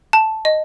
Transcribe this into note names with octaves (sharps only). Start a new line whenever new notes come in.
A5
D#5